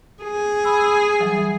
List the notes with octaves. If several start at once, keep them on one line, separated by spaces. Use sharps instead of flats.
G#4
B5 E6
E3 F#3 G3